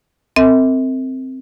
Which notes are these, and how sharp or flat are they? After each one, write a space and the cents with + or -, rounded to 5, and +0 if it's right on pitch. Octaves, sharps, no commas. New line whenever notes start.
C4 -5 A#4 -45 E5 -40